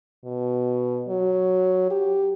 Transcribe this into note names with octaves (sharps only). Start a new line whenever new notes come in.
B2
F#3
G4